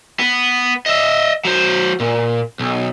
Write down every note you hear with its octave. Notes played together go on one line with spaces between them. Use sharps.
B3
D#5 E5
F#3 C5
A#2
B1